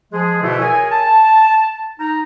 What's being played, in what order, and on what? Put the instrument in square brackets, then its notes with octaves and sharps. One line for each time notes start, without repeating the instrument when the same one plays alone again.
[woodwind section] F3 G#3 G#4
B2 D3 E3 F3 A3 E4
G#4 A#4 C#5 G#5
A5
D#4 A#5